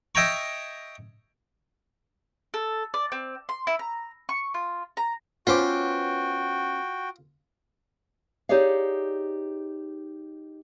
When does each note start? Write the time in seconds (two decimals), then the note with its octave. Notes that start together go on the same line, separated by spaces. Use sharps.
0.15 D#5 E5 G5 G#5 A#5 C#6
2.54 A4
2.94 D5
3.12 C4
3.49 C6
3.67 E4
3.79 A#5
4.29 C#6
4.54 F4
4.97 A#5
5.47 B3 C#4 F4 F#4 C5 G5 D6
8.49 D#4 G4 G#4 C#5 D5 F5